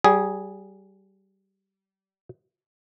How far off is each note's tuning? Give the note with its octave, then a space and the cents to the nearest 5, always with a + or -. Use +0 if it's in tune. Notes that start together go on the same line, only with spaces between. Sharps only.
G3 -25 G#4 +0